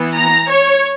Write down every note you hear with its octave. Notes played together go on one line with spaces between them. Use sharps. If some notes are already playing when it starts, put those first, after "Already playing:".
Already playing: E3 B3
A#5
C#5